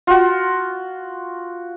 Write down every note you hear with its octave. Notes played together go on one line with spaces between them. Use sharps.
F4 F#4